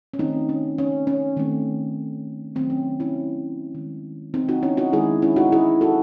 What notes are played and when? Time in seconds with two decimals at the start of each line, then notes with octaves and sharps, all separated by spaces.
0.14 C#4
0.19 D#3 A3 C4 D#4
0.49 C#4
0.78 C#4
1.07 C#4
1.37 D#3 A3 C4
2.55 D#3 F#3 A3 C4
2.70 C#4
3.00 C#4 E4
3.75 D#3 G#3
4.34 C4 D#4
4.49 D#4 F#4
4.62 C#4 E4
4.77 D#4 F#4
4.93 D#3 G#3 E4 G#4
5.22 C#4 E4
5.36 D#4 F#4
5.52 E4 G#4
5.81 F#4 A4